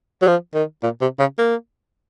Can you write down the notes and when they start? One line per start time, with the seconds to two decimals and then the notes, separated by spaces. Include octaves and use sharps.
0.22 F#3
0.27 F3
0.55 D#3
0.83 A#2
1.01 C3
1.19 C#3
1.38 A#3